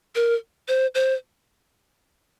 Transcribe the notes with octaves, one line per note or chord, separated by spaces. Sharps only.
A#4
C5
C5